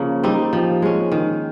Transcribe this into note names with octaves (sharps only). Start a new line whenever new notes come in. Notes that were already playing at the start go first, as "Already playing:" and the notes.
Already playing: C#3 F3 A#3
G3 C4 D#4
F3
G#3 C#4
D#3